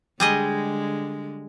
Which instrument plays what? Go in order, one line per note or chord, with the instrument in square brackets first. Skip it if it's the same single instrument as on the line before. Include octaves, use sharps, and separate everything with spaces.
[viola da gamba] D3 G#3 [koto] G3 G#4 D#5